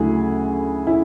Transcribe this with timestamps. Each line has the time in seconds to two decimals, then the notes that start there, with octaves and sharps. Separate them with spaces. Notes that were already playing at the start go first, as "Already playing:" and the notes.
Already playing: D2 C#3 F#3 A3 E4 G#4
0.87 C#4 E4